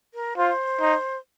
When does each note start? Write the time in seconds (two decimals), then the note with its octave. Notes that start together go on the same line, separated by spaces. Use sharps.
0.14 A#4
0.37 F4 C5
0.81 D#4